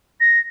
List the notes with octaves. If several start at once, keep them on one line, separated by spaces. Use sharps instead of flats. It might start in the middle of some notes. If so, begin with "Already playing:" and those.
A#6